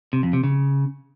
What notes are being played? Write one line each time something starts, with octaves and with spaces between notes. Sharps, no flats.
C3
F2
C3
C#3